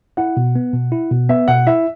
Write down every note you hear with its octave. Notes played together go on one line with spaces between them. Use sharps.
E4 F#5
B2
B3
B2
E4
B2
B3 E5
B2 F#5
E4 E5